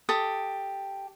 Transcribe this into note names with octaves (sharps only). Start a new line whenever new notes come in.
G4 A4 D#6